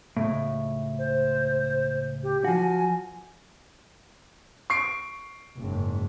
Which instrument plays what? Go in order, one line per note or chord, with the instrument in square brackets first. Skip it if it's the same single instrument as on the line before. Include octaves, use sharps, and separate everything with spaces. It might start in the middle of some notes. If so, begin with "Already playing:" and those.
[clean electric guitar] C#2 A2
[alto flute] C5
G4
[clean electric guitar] F3 F#4 [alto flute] G#5
[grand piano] C#6 C7 D7
[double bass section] F#1 G#2